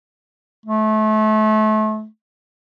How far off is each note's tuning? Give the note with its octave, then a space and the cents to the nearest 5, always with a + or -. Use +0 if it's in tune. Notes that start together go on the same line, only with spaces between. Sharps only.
A3 -30